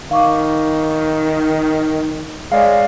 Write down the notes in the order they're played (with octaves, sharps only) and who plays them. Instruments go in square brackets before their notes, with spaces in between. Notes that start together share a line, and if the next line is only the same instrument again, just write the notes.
[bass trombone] D#3 [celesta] F5 C#6 D6
[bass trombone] G#3 [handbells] C#5 D5 F5